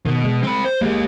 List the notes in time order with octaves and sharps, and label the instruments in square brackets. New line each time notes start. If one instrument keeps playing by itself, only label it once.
[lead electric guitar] B2 [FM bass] D#3
[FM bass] G#3
[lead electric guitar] C4 B5
C5
[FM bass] G#3 [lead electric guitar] A#3 G4